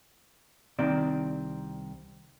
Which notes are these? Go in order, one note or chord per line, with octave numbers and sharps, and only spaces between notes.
C2 D#3 C4 D5